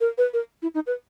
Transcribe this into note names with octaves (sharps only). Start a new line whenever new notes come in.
A#4
B4
A#4
E4
D#4
B4